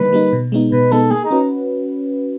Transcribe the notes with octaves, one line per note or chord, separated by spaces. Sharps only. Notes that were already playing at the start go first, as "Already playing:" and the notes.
Already playing: D3 G3 A#3 D#4 B4
G3 A#3 D#4
B2
G#3 B3 D#4
B2 B4
G#3 B3 D#4 A4
A#3 G#4
D#4
C#4 F#4 B4